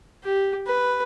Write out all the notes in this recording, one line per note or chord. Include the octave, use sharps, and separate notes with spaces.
G4
B4